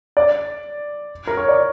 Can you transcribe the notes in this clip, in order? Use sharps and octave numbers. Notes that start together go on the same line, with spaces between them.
D5
A#4
C#5
D5